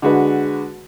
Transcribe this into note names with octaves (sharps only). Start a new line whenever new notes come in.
D3 G#3 F#4 B4